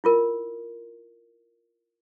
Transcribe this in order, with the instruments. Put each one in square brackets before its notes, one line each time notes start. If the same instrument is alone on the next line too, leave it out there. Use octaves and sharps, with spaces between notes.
[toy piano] E4 F4 A#4